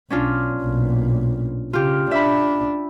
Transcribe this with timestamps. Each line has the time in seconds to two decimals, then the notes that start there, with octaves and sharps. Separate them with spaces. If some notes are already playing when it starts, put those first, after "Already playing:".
0.10 B1 C#4 D4 F4
0.61 B1 A#2
1.73 C#3 F4 G4
2.11 D4 E5 B5